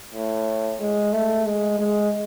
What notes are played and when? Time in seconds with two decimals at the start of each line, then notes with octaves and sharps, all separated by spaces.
0.14 A2
0.80 G#3
1.13 A3
1.46 G#3
1.79 G#3